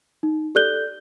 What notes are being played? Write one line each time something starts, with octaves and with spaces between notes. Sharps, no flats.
D#4
G4 A4 D5 F#6 G6 G7